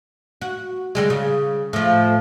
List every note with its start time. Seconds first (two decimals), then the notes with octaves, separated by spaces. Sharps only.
0.42 F#4
0.95 D3 G3 G#3
1.10 C#3
1.73 A2 F3